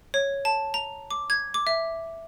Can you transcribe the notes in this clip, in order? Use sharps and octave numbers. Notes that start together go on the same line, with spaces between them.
C#5
A5
A#5
D6
G#6
D6
E5